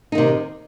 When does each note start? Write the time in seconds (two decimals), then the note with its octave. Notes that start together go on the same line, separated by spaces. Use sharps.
0.12 D#4
0.15 D#3
0.18 C3